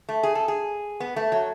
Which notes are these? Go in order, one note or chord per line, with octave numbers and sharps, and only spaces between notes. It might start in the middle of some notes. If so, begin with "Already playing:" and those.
A3
G#4
A4
G#4
B3
A3
F#3